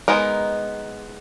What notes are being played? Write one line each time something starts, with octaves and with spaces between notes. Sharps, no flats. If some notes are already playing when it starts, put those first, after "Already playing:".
G#3 B3 D#4 A#4